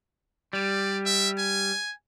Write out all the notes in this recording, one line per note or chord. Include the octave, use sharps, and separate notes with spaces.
G3 D5
E5
G#5